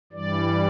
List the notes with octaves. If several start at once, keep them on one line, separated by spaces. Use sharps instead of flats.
G2 E3 G3 D5